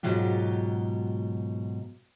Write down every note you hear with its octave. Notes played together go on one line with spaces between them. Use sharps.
G#2 B2 F#3 F4 G4